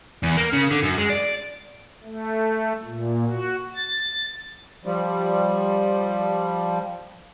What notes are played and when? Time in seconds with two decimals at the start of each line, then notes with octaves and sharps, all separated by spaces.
0.23 E2
0.37 A#3
0.53 C#3
0.71 D3
0.83 F#2
0.98 G#3
1.10 D5
2.04 A3
2.84 A#2
3.25 F#4
3.75 A6
4.85 F3 G3